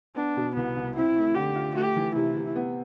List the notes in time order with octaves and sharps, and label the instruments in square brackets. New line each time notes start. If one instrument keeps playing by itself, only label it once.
[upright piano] B3 [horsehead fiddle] D4
[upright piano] B2
[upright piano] C2 [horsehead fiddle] B3
[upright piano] C2
[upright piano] C4 [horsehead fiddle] E4
[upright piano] A3
[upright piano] D3 [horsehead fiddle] G4
[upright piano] F4
[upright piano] A3 [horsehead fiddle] G4
[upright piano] E3
[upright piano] C3 [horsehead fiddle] E4
[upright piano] C3
B3